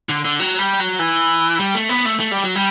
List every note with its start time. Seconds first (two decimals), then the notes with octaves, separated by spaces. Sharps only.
0.09 D3
0.25 D3
0.40 F#3
0.59 G3
0.80 F#3
0.99 E3
1.59 G3
1.75 A3
1.89 B3
2.05 A3
2.19 A3
2.31 G3
2.43 F#3
2.55 G3